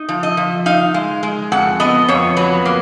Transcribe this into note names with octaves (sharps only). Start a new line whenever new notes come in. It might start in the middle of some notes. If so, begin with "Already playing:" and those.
Already playing: D#4
F3
D#5
F3
D#4 F5
G#3
G#3
F2 F#5
B3 D#5
F2 C#5
F#3 B4
A#3